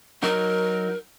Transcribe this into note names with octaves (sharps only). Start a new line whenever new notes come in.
F#3 D#4 F#4 A#4